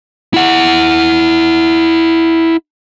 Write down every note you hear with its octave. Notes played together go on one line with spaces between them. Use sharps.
E4 F#5